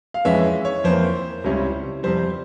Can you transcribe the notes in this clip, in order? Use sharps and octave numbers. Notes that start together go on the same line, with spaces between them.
F5
F2 E3 G#3 C#4 E5
C#5
F2 E3 A#3 C5
C#2 C3 G3 C#4 E4
F2 C3 G3 C5